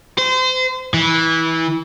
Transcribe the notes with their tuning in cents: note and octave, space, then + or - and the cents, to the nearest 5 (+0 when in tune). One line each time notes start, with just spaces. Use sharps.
C5 -30
E3 -20